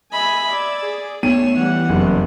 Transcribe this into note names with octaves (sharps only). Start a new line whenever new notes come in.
D#5 E5 G#5 B5
D5 E6 G#6
G#4
A3 B3 C#5 C7 D#7 E7
E3 G3 F#5
F#1